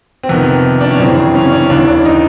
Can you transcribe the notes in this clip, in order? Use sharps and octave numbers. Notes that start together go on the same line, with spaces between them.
C4
F2 C3 D#3 B3
D4
C#4
F#2 C#3 E3 C4
C4
C#4
C#4
D4
D#2 C#3 E3 D4
D4
D#4